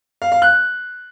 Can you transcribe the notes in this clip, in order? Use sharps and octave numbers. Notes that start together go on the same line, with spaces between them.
F5
F5
F#6